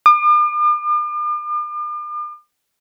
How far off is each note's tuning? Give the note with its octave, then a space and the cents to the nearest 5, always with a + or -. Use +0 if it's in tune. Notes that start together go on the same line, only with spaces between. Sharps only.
D6 +45